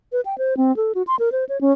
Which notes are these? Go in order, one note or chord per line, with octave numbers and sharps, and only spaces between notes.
B4
G5
C5
C4
A4
F#4
C6
A#4
C5
C#5
C#4